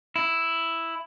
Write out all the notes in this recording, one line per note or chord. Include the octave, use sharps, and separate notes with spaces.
E4